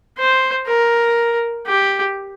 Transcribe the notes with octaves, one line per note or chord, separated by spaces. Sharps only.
C5
A#4
G4